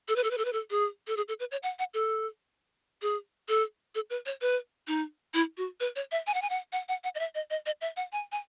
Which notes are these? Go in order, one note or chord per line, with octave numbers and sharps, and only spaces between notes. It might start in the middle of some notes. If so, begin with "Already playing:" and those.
A4
B4
A4
B4
A4
B4
A4
G#4
A4
G#4
A4
B4
C#5
F#5
F#5
A4
G#4
A4
A4
B4
C#5
B4
D#4
E4
F#4
B4
C#5
E5
G#5
F#5
G#5
F#5
F#5
F#5
F#5
D#5
E5
D#5
D#5
D#5
E5
F#5
G#5
G#5